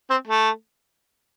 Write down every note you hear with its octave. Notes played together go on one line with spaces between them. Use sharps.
C4
A3